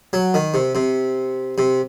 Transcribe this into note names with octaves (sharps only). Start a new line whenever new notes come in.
F#3
D#3
C3
C3
C3